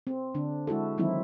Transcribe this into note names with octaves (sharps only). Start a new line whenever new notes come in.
C4
D3 D4
G#3 E4 F#4 A4
D#3 E3 F#3 C4 D#4 E4